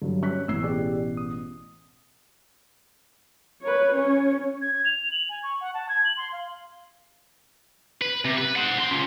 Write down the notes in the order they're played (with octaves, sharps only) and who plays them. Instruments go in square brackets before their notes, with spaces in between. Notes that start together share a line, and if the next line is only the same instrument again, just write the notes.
[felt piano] G2 [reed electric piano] D3 F#3
[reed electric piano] C#4 [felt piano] C#6 F#6 B6
[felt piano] A1 B2 C7 [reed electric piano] E6
[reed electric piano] G4 G#4 D5
D#6
[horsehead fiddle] B4 C#5
C#4 C#5
[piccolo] G#6
G#6
F7
F#7
G#5
C#6
F#5
A5
G#6
F#7
C6
F5
[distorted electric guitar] B4
C3
B4
C5 F#5
C4 C6
C#4 F4